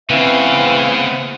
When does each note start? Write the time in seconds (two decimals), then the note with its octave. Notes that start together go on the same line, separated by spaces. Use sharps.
0.10 C#3 E3 B3 C4 E5 F5